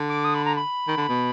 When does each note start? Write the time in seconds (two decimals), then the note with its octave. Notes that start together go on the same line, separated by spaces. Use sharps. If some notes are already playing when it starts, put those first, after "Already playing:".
Already playing: D3
0.09 D6
0.24 D#6
0.35 B5
0.45 A#5
0.55 B5
0.87 D#3
0.97 D3
1.08 B2